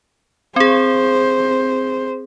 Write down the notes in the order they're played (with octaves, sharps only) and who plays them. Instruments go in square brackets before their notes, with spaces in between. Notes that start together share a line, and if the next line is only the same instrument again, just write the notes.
[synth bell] C4 G#4 [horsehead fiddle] C5